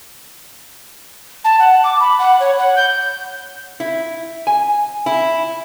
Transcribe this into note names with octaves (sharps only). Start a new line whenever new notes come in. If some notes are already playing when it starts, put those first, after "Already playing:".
A5
F#5
D6
B5
F#5
C#5
F#5
G6
E4
G#5
E4